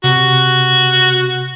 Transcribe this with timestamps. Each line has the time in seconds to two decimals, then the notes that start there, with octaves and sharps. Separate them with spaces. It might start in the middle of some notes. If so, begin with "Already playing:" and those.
0.04 C3 F#4